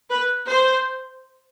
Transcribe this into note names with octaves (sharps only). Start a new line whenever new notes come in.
B4
C5